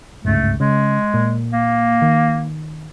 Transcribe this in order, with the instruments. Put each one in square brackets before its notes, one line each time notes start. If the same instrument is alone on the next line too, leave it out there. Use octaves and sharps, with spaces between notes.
[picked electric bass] G1 C#2 G#2 [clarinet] A3
[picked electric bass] C#3 [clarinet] G#3
[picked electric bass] A#2
[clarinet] A#3
[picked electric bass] D#3